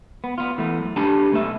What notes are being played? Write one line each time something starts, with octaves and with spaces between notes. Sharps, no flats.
B3
B3 F4
E3 A3 B3
F#2
D4 G4 A4 B4 G#5 A5
B1 A3 B4 E5